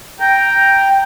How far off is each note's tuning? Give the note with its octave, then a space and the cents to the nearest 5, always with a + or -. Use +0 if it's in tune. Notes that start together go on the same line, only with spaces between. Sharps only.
G5 +0 A#5 +0